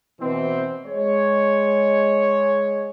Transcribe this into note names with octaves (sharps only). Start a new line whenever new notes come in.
B2 E3 C4
G#3 C#5